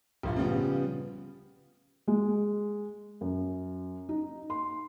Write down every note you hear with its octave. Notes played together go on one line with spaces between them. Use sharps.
A#1 G2 F4
C#3 F3 G3 B3
G#3
F#2
D#4
C6